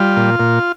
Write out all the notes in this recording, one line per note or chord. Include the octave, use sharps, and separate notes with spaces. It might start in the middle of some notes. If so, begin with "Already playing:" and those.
Already playing: G3 F4
A#2
A#2